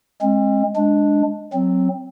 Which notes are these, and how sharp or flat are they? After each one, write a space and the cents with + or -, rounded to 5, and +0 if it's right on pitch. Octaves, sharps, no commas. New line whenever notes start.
G#3 +0 C4 +45
G#3 +0 D4 +0
F#3 +0 C4 +5